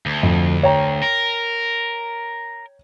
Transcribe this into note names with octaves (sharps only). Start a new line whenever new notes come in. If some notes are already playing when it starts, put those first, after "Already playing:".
D2
F2
C#5 G5 A#5
A#4